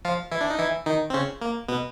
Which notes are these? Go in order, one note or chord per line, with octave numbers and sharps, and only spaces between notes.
F3 F4
E3 E4
D4
D#4
E3 E4
D#3 D#4
C4
C#3 C#4
A#3
B2 B3